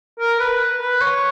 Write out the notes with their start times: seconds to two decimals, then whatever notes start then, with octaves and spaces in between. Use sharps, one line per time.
0.20 A#4
0.40 B4
0.81 B4
1.02 C#5